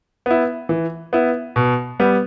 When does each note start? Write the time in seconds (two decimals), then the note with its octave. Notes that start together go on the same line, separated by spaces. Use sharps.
0.26 B3 E4
0.69 E3
1.13 B3 E4
1.56 B2
2.00 G3 B3